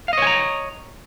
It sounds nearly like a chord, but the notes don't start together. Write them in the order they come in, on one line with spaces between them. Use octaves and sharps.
F5 D#5 C#5 G#5 A#5